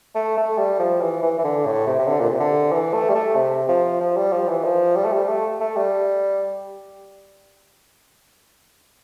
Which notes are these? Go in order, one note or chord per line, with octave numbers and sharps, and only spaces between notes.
A3
A3
G3
F3
E3
E3
E3
D3
A2
C3
C3
D3
A#2
C3
D3
E3
A3
G3
A3
C3
F3
F3
G3
F3
E3
F3
G3
A3
G3
A3
A3
G3